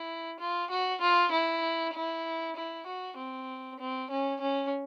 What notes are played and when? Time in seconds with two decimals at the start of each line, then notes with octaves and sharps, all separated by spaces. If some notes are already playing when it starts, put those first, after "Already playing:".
Already playing: E4
0.39 F4
0.70 F#4
1.01 F4
1.32 E4
1.94 E4
2.56 E4
2.86 F#4
3.17 C4
3.79 C4
4.10 C#4
4.41 C#4